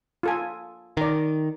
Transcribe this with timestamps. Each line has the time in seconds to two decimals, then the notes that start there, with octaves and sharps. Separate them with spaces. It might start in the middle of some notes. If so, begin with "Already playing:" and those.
0.23 F4 A4 G#5
0.97 D#3 D5 A#5